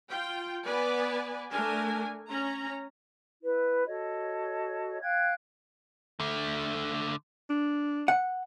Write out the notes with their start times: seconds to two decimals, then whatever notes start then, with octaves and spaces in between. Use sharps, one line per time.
0.11 F4 G5
0.66 B3 B4 D5 G#5
1.50 A3 D4 A#4 G#5
2.30 C#4 A#5
3.42 E4 B4
3.87 F#4 A4 C#5 D#5
5.01 F5 G5 F#6 G#6
6.20 D3 A3
7.50 D4
8.08 F#5